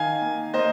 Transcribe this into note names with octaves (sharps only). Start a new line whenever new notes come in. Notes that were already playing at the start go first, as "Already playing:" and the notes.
Already playing: D#3 F5 G#5
A#3
A#3 C5 D#5